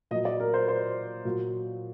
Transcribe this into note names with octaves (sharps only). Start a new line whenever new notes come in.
A#2 F#3 D#5
D5
A#4
C5
C5
A#2 F#3